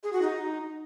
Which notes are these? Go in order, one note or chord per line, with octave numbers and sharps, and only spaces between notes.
G#4
F#4
D#4